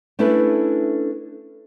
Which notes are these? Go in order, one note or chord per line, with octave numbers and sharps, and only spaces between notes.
A3 C#4 D4 E4 A4 B4